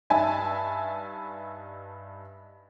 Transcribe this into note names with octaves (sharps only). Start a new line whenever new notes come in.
G2 D#4 E5 G#5 A5 B5